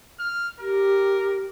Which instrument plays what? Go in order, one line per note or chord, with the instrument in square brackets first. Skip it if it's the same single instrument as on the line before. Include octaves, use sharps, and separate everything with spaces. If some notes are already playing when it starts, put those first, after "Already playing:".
[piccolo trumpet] F6
[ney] G4 [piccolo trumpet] A#4